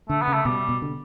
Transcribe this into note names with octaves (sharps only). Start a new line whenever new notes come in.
D3 A3
B3
C#3
A3
B2 G3
B2
D3